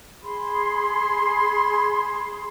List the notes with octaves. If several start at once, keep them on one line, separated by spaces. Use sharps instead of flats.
G#4 B5 C6